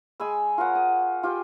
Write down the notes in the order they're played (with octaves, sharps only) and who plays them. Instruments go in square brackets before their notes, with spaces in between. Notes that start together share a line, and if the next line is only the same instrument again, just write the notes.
[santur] G#3 G#5 B5 E6
F4 A#4 C#5 F#5
D#6
F4 G4 G5 G#5